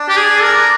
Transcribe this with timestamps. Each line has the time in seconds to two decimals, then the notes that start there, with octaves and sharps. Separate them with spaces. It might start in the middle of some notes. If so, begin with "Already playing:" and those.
Already playing: D4
0.09 G4
0.17 G#4
0.43 A#4